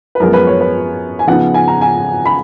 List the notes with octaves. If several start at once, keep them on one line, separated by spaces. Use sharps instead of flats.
B4
F#2 F3 G#3 B3 A#4
B4
C#5
B4
G#5
C#3 F3 B3 D#4 F#5
G#5
A#5
G#5
B5